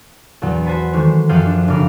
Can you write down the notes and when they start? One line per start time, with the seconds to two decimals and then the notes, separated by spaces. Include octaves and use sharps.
0.42 A#1 E2 F#3
0.66 F#4 C5 G#5 A5 B5
0.93 D#3 E3 G#3 A3
1.29 F#2 F3 G3 G#4 F5 G5
1.46 D4
1.68 F1 C#3 D5 D6 F6 A#6